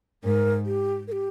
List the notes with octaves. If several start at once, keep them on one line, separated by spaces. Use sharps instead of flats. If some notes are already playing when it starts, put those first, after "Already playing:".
G#2 A#4
G4
A#4
G4